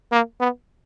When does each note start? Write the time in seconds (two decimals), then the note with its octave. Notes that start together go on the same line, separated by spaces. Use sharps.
0.12 A#3
0.40 B3